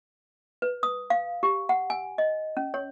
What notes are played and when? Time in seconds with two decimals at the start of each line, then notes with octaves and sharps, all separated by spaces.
0.62 B4
0.83 D#6
1.10 F5
1.43 G4
1.69 F#5
1.90 G#5
2.18 D#5
2.57 C#4
2.74 C#5